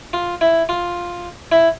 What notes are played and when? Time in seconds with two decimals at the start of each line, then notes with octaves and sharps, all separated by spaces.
0.13 F4
0.41 E4
0.69 F4
1.52 E4